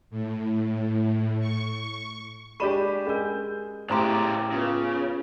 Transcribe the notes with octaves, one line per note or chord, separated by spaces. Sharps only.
A2
C#6
G#3 D4 G4 B5 C#6 D#7 E7
G#3 C#4 G#4 A#4 G6
A2 C#3 G4 C5 A#5 C6 D6
C#3 B3 F4